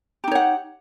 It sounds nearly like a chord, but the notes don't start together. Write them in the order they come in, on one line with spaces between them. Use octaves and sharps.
G4 D#4 C#5 F#5